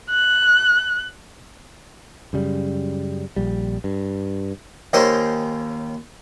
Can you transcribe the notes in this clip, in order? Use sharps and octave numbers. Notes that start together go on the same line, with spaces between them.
F#6
F#2 C#3 G3
A#1 G3
G2
D#2 D#3 C#4 C5 D#5 C6